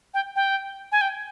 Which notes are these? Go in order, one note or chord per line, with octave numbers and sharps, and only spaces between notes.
G5
G5
G#5
G5